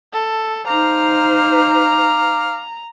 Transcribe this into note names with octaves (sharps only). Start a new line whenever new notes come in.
A4
D#4 C5 F5 A#5 D6